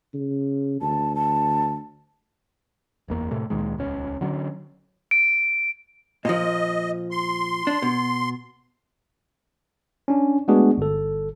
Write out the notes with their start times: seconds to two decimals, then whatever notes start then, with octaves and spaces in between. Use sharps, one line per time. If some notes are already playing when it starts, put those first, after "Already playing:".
0.14 C#3
0.82 D2 A5
1.15 A5
3.08 F#1 E2 A#3
3.31 A2 C3 A3
3.50 C#2 A#2 D#3 G#3
3.77 D#1 C#2 C#4
4.21 D3 F#3 C#4
5.11 D7
6.25 A#2 F3 D#5
7.11 C6
7.67 D4
7.82 B2
10.08 C#4 D4
10.48 G#3 A3 B3 D4 F#4 G#4
10.78 G1 A4